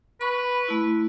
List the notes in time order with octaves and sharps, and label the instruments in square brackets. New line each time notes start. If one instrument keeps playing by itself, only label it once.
[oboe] B4 [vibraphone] B5 C#6
[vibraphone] A3 E4